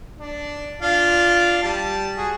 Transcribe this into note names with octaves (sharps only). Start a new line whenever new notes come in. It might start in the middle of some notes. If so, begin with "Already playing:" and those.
D4
D4 F4 F5
G3 A5
F#4 G#4